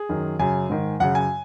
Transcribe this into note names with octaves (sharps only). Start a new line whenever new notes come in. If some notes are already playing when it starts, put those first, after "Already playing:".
Already playing: G#4
F#2 D#3
F#2 C#3 G#5
G#2 D#3
F#2 C#3 F#5
G#5